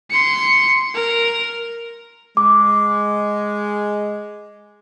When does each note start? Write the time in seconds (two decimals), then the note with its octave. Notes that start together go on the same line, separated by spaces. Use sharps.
0.11 C6 C#7
0.94 A#4
2.37 G#3 D6